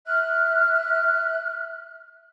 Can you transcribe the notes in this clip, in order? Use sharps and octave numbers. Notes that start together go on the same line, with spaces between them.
E5 F6 F#6